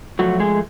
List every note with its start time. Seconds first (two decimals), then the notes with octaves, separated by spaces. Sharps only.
0.19 F3 F#3 A3 F#4
0.40 G#3 G#4